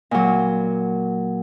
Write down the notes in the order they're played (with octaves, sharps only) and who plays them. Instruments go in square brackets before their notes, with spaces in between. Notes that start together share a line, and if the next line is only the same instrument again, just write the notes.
[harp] A#2 F#3